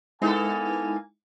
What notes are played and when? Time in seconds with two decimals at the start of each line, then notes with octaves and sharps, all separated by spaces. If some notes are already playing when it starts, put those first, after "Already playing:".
0.22 G#3 A#3 B3 D#4 E4 A4 G#5